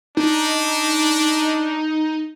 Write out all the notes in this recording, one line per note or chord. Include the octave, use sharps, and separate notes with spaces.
D4 D#4